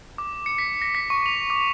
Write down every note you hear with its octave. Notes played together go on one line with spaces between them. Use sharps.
D6
C#7
B6
A#6
B6
C#6
F7
D6